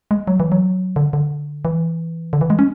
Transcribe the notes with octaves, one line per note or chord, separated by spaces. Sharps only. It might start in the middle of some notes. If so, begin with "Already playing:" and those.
G#3
F#3
E3
F#3
D3
D3
E3
D3
E3
G#3
C#4